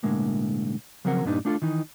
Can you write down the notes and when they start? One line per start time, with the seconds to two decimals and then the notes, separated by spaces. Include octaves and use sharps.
0.03 B1 A2 D3 G#3 A#3
1.05 C#3 F3 F#3 C4 A#4 F#5
1.25 G2 A#2 G3 D4 D#4
1.45 A3 D4 F4 G#4 A4
1.62 D#3 E3 D#4